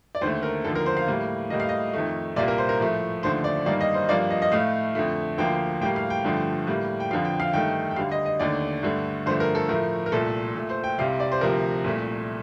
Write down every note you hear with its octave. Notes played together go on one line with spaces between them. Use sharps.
D5
D#2 D3 A3 C5
A#4
D#2 D3 F3 A4
A#4
C5
F5
A2 G3 A#3
A2 G3 A#3 D#5
F5
D#5
F2 D#3 A3
C2 A#2 G3 A#3 D5
A#4
C5
A#4
A2 F3 A3
D#2 D3 F3 A3 C5
D5
G2 D#3 G3 A#3 D5
D#5
C5
G2 F3 A#3 D5
D#5
D#5
A2 A3 F5
F2 D3 A3
D2 D3 F3 A#3 G5
A2 G3 A#3 G5
F5
G5
G2 D3 F3 A3
A2 G3 A#3
G5
F2 D3 F3 F5
G5
F5
G2 D#3 A3 G5
G5
D2 D3 G3 F5
D#5
D#5
D#2 D3 A3 D5
G2 D3 A3
G2 D3 F3 A3 C5
A#4
A4
A2 F3 A3 A#4
A#4
C2 A#2 A3 A4
A#2 A3
C5
G5
C2 C3 G3 F5
D5
C5
D2 C3 F3 A#4
C2 A#2 A3